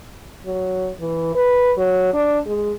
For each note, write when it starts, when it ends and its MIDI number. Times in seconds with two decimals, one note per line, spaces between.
0.46 0.90 54
1.00 1.31 52
1.35 1.72 71
1.77 2.11 54
2.13 2.39 62
2.46 2.72 56